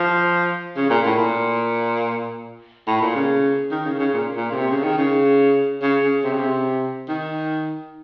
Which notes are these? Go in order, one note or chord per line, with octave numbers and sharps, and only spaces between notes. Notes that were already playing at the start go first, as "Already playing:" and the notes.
Already playing: F3
C#3
A#2
A2
A#2
A2
A#2
C#3
D#3
C#3
C#3
A#2
A#2
C#3
C3
C#3
D#3
C#3
C#3
C#3
C3
C#3
C3
D#3